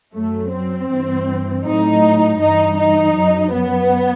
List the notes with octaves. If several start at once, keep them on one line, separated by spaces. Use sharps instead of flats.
F#2 F#3 A3
C4
G2 E3
A2 F#3 D#4
G2 E3 D#4
D#4
F#2 F#3
B3